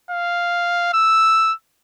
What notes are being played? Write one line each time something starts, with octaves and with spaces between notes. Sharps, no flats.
F5
E6